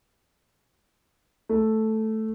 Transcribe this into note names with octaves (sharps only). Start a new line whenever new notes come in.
A3